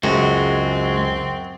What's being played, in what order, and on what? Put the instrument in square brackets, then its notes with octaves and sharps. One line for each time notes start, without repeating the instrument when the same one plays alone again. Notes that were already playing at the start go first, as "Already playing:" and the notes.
[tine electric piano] C#2 C#3 [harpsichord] F#2 [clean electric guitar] G#3 F#4 [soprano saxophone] C4